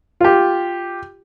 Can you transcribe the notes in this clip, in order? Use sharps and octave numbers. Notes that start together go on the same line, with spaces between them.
F4 G4